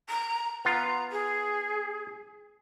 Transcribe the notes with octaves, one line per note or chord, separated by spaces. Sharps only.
A#5
B3 F4 A#5
G#4